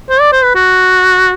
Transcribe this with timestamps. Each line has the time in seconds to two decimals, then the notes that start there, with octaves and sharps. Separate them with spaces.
0.10 C5
0.20 D5
0.32 C5
0.43 B4
0.55 F#4